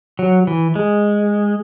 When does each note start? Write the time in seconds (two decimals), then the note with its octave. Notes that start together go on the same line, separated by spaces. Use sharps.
0.19 F#3
0.47 E3
0.75 G#3